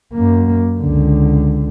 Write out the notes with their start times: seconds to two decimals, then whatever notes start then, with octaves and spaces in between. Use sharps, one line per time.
0.14 F#2 A#3
0.80 C#2 D3